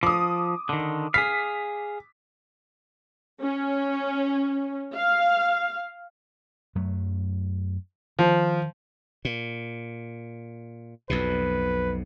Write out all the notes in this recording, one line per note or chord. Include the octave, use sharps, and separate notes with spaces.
F3 D6 D#6
D3 D#3
G#4 F5 B6
C#4
F5
F#2 F#3 A3
D#3 F3
A#2
B1 F2 B2 B4